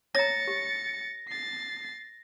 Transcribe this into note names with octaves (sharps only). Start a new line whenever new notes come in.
C#5 A#5 A6 A#6 C#7
G4
A6 C7